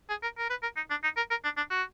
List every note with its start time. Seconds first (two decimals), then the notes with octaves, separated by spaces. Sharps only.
0.10 G#4
0.23 A#4
0.38 A#4
0.50 B4
0.63 A#4
0.77 D#4
0.90 D4
1.04 D#4
1.17 A#4
1.31 A#4
1.44 D4
1.57 D4
1.71 F#4